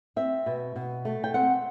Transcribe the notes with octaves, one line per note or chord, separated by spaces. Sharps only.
C4 E5
B2
B2
A3
G5
C4 F#5